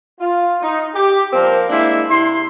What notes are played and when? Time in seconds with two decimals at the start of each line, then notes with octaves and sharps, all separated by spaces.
0.20 F4
0.62 D#4
0.94 G4
1.33 F3 G3 A#3 C4 A#4 C5
1.69 G#3 A#3 D4 E4 C5 E5
2.09 C3 E4 C6